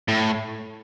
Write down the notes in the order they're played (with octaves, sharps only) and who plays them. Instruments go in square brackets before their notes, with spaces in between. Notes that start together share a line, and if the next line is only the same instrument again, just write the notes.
[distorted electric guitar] A2